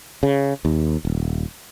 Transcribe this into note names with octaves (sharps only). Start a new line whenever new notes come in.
C#3
D#2
D#1